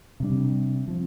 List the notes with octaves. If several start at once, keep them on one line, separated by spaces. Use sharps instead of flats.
C3 G3 D4
F3 C4